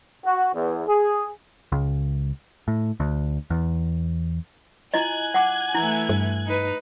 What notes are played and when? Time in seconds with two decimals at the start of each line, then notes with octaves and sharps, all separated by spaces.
0.25 F#4
0.53 E2
0.87 G#4
1.72 C#2
2.68 A2
3.00 D2
3.50 E2
4.94 E4 F4 D#5 G#5 F#6 G#6
5.34 F#5 D6
5.75 E3 A3 E4
6.09 G2
6.47 D#4 B4